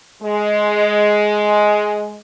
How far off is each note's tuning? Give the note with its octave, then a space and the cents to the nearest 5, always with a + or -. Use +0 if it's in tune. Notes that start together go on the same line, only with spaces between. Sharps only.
G#3 +10